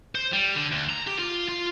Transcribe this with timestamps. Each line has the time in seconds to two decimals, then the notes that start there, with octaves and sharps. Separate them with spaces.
0.15 C5
0.33 G3
0.56 D3
0.72 D2
0.89 A#5
1.07 G4
1.19 F4
1.49 F4